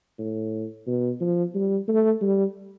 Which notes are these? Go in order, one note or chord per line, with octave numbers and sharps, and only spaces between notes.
A2
B2
F3
G3
A3
G3